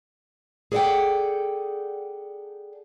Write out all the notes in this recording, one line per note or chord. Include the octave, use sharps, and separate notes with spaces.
G#4 A4 D5 D#5 F#5 G5